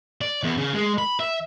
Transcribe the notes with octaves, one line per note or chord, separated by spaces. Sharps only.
D5
E2
C#3
G#3
B5
E5